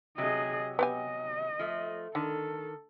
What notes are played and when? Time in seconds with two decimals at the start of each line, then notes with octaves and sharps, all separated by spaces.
0.18 C3 F#3 G#4 D#5
0.79 B3 G4 D#5 G#5
1.59 F3 A3
2.15 D3 D#3 A4